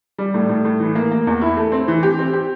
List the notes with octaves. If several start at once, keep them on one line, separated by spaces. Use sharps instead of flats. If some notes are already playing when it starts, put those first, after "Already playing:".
G3
A2
A2
A2
E3
A#3
A#3
E2
E4
A3
C4
E3
G4
C4
G4